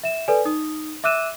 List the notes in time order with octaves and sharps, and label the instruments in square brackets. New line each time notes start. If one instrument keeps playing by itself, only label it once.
[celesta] E5 E7
A4 B4 D5 G#5
D#4 D#6
E5 D6 E6 F#6 D#7 E7